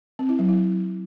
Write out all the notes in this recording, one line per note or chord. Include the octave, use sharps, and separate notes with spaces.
C4
E4
F#3
E4